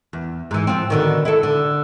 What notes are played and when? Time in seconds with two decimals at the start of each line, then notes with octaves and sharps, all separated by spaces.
0.13 E2
0.51 G#2 E3
0.67 F3 C4
0.90 B2 D3 D#3
1.25 E4 A4
1.43 D3